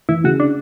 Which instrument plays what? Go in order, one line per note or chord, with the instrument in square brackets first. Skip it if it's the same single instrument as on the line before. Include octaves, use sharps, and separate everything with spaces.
[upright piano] E3 [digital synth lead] E4
[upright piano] C#3 [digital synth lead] F#4
[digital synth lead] D4